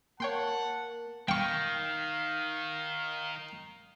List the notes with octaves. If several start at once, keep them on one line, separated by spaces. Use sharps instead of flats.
A#3 C#5 F#5 G5 A5 C6
D#3 F5 G5 C#6